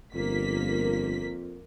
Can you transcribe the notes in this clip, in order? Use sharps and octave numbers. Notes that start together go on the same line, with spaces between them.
G1 F2 A#3 B6